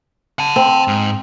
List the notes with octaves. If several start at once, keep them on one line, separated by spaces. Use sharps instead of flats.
F#5 A5
C4
G#2